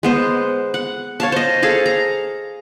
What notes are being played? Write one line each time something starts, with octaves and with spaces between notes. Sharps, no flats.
G#3 B3 C5
F#5
C#5 F5 A5
C5 D#5
G#4 A4 F5
A#5